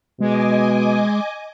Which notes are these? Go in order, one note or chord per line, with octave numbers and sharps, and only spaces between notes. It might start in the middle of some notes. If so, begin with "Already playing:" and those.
B2 G#3 D#5 G#5 D6